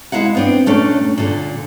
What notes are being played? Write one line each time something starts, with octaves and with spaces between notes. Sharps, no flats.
G#3 E4 F5 F#5
B3 C4 D4
A#2 A3 C#4 D4
A#2 D3